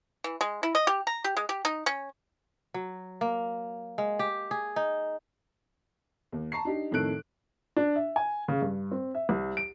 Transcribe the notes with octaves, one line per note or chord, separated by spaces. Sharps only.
E3
G#3
E4
D#5
G4
A#5
G4
G#3
G4
D#4
C#4
F#3
A#3
G#3
G4
G#4
D#4
D#2
A5 A#5 C#6 C7
D4 D#4 G4
F2 A2 D#3 A4 F#6 D7
D4
E5
G#5
C#3
G2
C4
E5
C2
D7